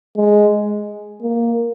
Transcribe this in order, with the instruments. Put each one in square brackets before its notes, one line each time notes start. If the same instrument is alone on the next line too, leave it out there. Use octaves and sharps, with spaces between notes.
[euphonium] G#3
A#3